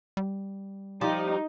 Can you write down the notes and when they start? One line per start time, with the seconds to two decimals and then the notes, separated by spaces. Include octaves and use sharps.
0.17 G3
1.01 F3 D#4 G4 D5